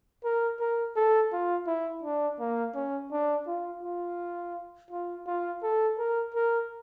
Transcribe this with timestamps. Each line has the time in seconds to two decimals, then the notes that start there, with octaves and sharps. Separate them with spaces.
0.24 A#4
0.60 A#4
0.96 A4
1.32 F4
1.67 E4
2.03 D4
2.40 A#3
2.75 C#4
3.12 D4
3.47 F4
3.83 F4
4.91 F4
5.27 F4
5.62 A4
5.98 A#4
6.34 A#4